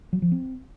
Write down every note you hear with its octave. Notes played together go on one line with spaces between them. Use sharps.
F#3
F3
C4